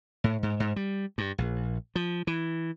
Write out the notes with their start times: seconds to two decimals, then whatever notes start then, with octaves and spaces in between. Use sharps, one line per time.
0.24 A2
0.43 G#2
0.60 G#2
0.76 G3
1.18 G2
1.38 A#1
1.95 F3
2.27 E3